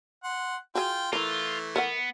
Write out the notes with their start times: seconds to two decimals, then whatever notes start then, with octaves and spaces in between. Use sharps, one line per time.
0.24 F#5 C6
0.75 F4 F#4 G#4 G5
1.13 E3 A3 E4 F4 A#4
1.76 B3 A#4 E5 F#5